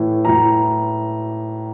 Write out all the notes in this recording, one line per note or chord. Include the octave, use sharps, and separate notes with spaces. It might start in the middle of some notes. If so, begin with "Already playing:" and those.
Already playing: A2 E3
A2 E3 A#5